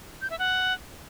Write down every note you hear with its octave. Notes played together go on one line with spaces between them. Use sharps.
G6
E5
F#5